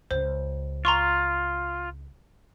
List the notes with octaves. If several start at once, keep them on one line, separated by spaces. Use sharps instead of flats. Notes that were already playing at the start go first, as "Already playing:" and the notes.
C#2 C5
F4 A#5 C6 C#6